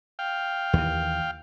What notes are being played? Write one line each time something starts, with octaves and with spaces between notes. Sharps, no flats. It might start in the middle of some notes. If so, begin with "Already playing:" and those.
F5 G5
D#2 E3